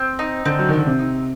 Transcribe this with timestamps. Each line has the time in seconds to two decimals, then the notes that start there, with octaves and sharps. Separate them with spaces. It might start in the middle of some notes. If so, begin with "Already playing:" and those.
Already playing: C4
0.19 D#4
0.45 D3 C4
0.59 F#3
0.69 D#3
0.73 D3 C4
0.87 C3
0.99 D#4